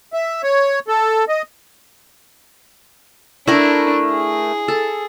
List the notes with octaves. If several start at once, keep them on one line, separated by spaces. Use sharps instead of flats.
E5
C#5
A4
D#5
A3 D4 E4 A#4
G#4
A4